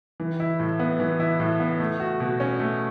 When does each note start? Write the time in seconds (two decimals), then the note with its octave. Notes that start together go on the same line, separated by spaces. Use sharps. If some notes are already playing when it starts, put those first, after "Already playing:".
0.20 E3
0.40 E4
0.60 A2
0.79 B3
1.00 E3
1.20 E4
1.40 A2
1.60 B3
1.80 A3
2.00 F#4
2.20 B2
2.40 C#4
2.59 A3